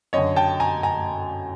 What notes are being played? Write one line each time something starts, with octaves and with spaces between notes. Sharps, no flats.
F#2 D3 C#5 D#5
G5 A5
G#5 A#5
G#5 A#5